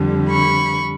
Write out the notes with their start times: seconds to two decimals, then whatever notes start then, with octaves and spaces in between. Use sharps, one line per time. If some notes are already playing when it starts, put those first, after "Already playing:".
Already playing: F2 D3 G3
0.30 B5 C#6